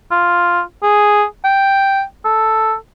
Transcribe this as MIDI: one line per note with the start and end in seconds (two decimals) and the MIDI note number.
0.11 0.62 65
0.83 1.24 68
1.45 2.03 79
2.25 2.75 69